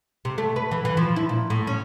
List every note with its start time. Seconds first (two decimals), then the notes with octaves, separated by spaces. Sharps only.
0.25 C3
0.38 A3
0.56 B4
0.71 E3
0.85 E3
0.97 F3
1.16 E4
1.29 A#2
1.50 A2
1.67 C#4